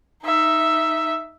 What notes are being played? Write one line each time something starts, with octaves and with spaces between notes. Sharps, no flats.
D#4 E5